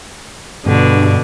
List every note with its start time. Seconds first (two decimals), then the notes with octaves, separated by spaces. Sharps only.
0.66 G2 B2 D3